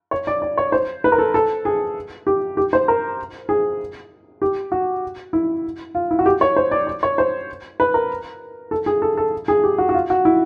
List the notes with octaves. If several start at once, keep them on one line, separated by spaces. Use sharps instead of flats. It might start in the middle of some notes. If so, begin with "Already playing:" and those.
C#5
D5
D5
C#5
C5
B4
A#4
A4
A4
G#4
G4
G4
C5
A#4
G#4
G4
F#4
E4
F4
E4
F#4
G4
C#5
C5
D5
D5
C#5
C5
B4
A#4
A4
G#4
A4
A4
G#4
G4
F#4
F#4
F4
F#4
E4